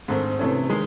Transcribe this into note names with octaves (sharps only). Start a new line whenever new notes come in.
G#2 D#3 A3 C4
C3 E3 A3 C#4
D#3 G#3